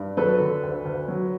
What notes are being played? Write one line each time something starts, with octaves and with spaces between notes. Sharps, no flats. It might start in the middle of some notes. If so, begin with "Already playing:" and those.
Already playing: G2
F#3 A4 B4
D3
D2
D2
F#3